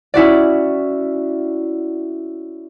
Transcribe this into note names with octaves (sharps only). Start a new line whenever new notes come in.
C#4 E4 F#4 D5